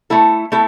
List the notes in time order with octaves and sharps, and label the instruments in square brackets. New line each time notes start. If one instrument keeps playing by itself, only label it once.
[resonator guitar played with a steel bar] A3 E4 A4
A3 E4 A4